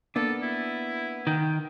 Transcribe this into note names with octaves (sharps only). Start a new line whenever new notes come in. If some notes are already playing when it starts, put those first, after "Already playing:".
A#3 B3 D4 A4
E4
D#3 G5